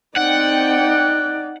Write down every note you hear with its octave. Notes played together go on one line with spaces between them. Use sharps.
C4 D#4 D5 F#5 G5